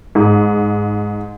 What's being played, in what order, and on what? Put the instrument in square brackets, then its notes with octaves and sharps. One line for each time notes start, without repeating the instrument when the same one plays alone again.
[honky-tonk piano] G#2